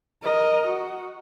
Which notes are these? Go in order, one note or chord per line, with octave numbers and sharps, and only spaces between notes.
A#4 D#5
F#4